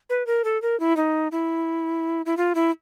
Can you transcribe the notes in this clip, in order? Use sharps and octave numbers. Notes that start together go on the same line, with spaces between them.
B4
A#4
A4
A#4
E4
D#4
E4
E4
F4
E4